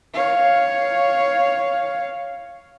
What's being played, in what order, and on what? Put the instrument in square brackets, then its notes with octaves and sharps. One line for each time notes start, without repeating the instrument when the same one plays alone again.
[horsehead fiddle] C#5 F5